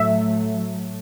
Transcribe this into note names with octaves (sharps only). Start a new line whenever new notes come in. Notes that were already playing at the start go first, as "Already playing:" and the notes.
Already playing: A2 F#3 A3 E5